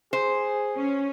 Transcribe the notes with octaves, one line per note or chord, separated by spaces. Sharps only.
G#4 C5
C#4